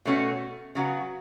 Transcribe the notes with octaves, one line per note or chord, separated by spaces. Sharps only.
B2 A3 C#4 F#4
C#3 F#3 B3 F#4